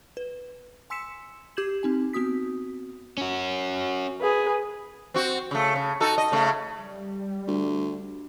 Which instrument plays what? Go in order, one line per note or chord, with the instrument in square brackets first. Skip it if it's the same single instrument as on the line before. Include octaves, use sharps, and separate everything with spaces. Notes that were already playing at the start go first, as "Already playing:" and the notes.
[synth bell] B4
G#5 C6 E6 B6 C#7 E7
G4 D6 G6 G#6 E7 F#7
C4 D#4 G#5
B3 C4 F#4 D#6 B6
[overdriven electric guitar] C#4 F#4
[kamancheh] G#4 B4
[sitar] C4 F#4
C#3 A3
C#3
D#4 F#4 A4
D#5
C#3 A3
[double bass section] G3
[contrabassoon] D2